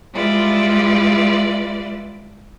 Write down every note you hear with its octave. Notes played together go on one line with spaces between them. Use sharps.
G3 G#3 E4 F4 B4 D5